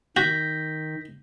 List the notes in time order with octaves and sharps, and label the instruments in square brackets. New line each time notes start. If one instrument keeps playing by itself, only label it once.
[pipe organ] D#3 [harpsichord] F#4 [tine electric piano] G6 A#6 B6